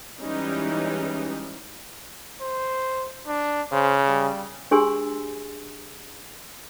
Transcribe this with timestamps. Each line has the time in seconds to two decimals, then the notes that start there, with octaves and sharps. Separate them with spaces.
0.19 E3 G3 G#3 C#4 D#4
2.41 C5
3.28 D4
3.72 C#3 C5
4.07 G3
4.71 D4 G4 G#4 G#5 C6 E6